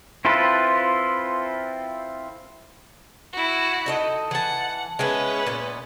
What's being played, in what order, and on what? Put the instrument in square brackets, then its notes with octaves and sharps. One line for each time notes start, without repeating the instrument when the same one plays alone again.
[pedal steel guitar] C4 E4 F4 A4 B4
[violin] E4 F#4
[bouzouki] D#4 A4 D#5
[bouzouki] E3 A5 [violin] F#5
[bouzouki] G#3 B3 E4 [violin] C#4 B4
[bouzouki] A#2 B3